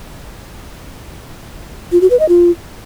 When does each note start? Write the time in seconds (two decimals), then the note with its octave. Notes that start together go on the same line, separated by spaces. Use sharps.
1.92 F4
2.01 F#4
2.10 B4
2.19 D#5
2.29 F4